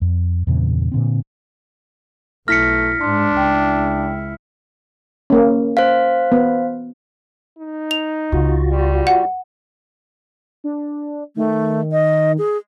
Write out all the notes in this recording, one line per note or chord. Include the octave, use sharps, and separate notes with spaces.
F2
E2 G2 A#2 C#3
A#2 D3 C4
B1 A3 E4 F6 A#6 B6 C#7
G#2 D4 C6
C#2 E4 G5
A#3 C#4
C5 F5
B3
D#4
F7
C#2 F4 F#4
G3
F#5
D4
D#3 A3
D#5
G#4